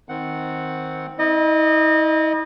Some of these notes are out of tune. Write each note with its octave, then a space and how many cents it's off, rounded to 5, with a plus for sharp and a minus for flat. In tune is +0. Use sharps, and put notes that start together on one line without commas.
D#3 +15 C4 +0 F#5 +0
E4 -45 D#5 -20